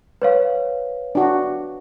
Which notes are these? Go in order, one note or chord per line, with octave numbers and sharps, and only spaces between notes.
B4 C#5 F5
D4 F#4